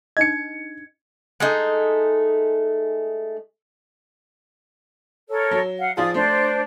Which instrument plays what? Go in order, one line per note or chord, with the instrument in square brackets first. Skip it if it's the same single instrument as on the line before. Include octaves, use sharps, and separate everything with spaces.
[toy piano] D4 D#4 D#5 [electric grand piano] G#6 C#7
[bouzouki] G#3 A3 D#4
[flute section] A4 A#4 C#5
[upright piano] F#3
[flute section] F5 F#5
[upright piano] F3 F4 G#4 [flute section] D5 D#6
[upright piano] A3 [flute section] D4 C5 D5